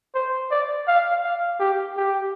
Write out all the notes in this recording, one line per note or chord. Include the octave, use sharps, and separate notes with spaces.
C5
D5
F5
F5
G4
G4